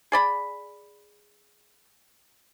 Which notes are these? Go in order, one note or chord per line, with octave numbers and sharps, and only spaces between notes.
G#4 D5 B5